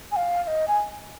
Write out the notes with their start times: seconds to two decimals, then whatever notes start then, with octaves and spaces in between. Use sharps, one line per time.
0.12 G#5
0.16 F5
0.44 F5
0.47 D#5
0.68 G#5